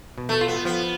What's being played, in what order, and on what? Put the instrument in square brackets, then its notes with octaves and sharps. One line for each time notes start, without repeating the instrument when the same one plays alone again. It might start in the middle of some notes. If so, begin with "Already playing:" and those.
[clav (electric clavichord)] B2
[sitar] A3
[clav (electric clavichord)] F4
[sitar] B3
[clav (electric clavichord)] F3 [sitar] B3